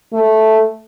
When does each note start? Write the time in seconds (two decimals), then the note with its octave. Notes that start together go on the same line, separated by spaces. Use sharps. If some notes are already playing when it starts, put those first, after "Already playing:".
0.13 A3